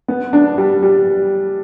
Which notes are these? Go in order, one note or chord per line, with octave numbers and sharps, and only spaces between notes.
B3
D4
G3
G3